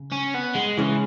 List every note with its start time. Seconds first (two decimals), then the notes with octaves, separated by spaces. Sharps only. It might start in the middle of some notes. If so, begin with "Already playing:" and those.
Already playing: C#3
0.12 C#4
0.34 B3
0.55 G#3
0.77 C#3 E3 G#3 C#4